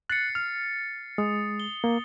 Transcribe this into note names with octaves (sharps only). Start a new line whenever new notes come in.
F#6 A6 C7 C#7
F6
G#3 D#6
G7
A#3